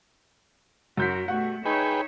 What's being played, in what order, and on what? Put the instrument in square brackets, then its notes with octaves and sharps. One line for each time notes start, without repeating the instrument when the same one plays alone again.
[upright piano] F#2 G6 B6 [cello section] F#4 A#4
[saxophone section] B2 G3 F#4 [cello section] A3 [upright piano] F#5
[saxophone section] D#4 [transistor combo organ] G#4 B4 G5 [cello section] C#5 E5